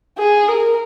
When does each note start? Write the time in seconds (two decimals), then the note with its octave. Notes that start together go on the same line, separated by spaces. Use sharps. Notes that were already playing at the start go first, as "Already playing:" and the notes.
0.18 G#4
0.48 A#4